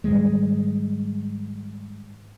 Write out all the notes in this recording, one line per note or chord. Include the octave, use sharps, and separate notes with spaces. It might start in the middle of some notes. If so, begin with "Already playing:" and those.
G#2 D#3 G3 G#3